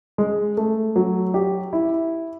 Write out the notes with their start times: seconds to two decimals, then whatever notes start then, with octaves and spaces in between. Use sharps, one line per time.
0.18 G#3
0.57 A3
0.96 F#3
1.34 G4
1.73 E4